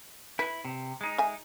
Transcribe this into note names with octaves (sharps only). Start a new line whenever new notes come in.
E4 B4
C3
G#3 D#4
E5 G#5